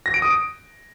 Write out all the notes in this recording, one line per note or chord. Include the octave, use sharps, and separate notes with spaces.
A#6
D7
D#6
D7